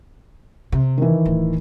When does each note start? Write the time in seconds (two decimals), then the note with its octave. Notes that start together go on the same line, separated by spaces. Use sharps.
0.72 C3
0.98 D#3 E3
1.26 D1